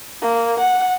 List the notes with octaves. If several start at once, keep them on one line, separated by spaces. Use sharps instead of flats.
A#3
F#5